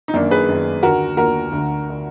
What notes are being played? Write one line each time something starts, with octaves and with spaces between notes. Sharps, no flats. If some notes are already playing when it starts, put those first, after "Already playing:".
D#4
F#2 D#3 A#3 D4
G#4 B4
F#2 D#3
D#2 D3 F#4 A#4
D#2 D3 F#4 A#4
D2 D3
D3